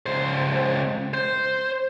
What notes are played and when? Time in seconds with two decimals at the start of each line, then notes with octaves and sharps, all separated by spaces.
0.06 C#2 C5
1.14 C5